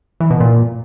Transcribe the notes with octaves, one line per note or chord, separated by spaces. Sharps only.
E3
B2
A#2